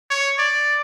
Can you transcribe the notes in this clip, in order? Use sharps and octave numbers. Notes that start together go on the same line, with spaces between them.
C#5
D5